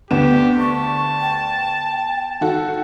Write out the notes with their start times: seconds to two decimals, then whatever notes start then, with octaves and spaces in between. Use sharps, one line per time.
0.11 D2 B3 G4 E7
0.59 A5 C#6
1.21 G5
2.41 D#3 F#4 A4